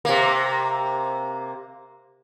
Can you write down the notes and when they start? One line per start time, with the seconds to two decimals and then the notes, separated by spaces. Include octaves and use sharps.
0.05 C3 A#3